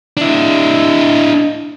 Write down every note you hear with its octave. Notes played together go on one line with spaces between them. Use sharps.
D4 E4